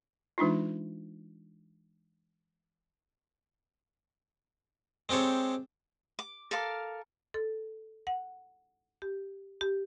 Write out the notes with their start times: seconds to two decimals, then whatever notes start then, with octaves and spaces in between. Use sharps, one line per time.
0.38 E3 G#3 D4 D#4 F4
5.09 G#3 C4 G4 A4 C#5
6.19 D6
6.51 A4 A#4 F5 D6
7.34 A4
8.07 F#5
9.02 G4
9.61 G4